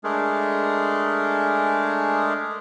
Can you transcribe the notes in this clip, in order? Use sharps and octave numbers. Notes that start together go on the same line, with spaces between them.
G#3 A3 D4 G#4 A#4